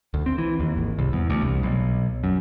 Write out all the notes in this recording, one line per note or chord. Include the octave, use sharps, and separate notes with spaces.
D2
C4
E3
D#2
G#1
C2
E2
D2
C2
B1
F#2